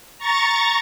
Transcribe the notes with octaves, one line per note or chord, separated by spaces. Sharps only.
A#5 C#6 A6